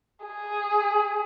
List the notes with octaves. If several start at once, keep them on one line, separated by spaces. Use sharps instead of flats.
G#4